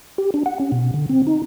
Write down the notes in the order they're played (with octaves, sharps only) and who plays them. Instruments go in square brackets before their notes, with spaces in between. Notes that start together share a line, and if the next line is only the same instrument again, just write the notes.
[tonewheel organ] G4
D4
F#5
C#4
B2
D3
C4
D#4